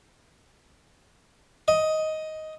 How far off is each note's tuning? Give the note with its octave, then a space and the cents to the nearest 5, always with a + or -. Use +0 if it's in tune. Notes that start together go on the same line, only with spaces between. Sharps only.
D#5 +10